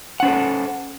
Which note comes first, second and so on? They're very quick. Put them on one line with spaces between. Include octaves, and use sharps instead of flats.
F#5 C#4 C5 A4